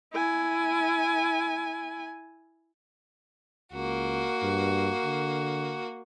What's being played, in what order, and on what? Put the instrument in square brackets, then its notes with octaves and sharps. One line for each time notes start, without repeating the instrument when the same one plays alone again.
[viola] E4 G#5
[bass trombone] C#2 [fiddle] A#3 F#4
[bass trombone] G2
D3